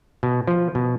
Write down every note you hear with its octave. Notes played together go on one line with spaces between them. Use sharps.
B2
F3
B2